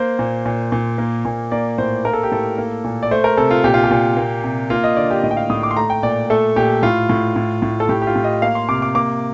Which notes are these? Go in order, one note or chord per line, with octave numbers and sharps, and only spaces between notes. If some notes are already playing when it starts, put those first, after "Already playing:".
Already playing: A#3 C5
A#2
A#2
A#2
A#3
A#2
A#3 D5
A2 C5
A#3 A#4
A4
G4
A2 A4
A#3
A#2
D5
A3 C5
A#4
C3 A4
F4
A#2 G4
F4
G4
A#2
A#3
C3
A#3 F4
D#5
D3 D5
G4
A2 D#5
G5
F5
A2 D#6
D6
C6
A3 A#5
G5
A#2 D5
A3 A4
A#2 G4
A2 F4
A2
A2
A2
A4
A2 G4
G4
F4
A2
D#5
A#3 F5
C6
C3 D6
D6
A#3 D6